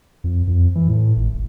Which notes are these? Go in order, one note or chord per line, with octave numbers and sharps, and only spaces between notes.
F2
F2
E3
A2
G#1
D#1